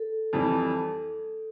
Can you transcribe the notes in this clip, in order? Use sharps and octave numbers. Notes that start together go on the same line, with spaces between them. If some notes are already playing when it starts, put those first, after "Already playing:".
Already playing: A4
F2 E3 G3